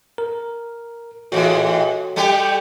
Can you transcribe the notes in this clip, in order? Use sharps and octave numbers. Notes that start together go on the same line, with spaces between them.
A#4
A2 E3 G#3 F#4 A4 C#5
G3 A3 G4